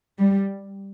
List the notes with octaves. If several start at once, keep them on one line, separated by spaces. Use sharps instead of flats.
G3